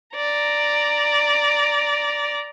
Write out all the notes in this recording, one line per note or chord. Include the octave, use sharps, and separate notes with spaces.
D5 A#5